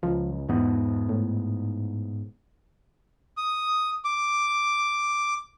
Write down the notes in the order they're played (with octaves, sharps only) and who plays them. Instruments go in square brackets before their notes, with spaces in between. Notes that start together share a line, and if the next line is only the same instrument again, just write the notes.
[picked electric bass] C#2 [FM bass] F3
[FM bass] E2 [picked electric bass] G#2 B3
[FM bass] A2
[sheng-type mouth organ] D#6
D6